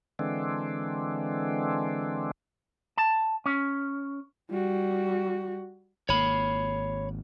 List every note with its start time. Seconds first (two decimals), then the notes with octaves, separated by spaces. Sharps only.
0.19 D3 E3 G#3 C4 D4
2.98 A5
3.46 C#4
4.51 G3 F#4
6.09 G#1 A#3 C#5 B5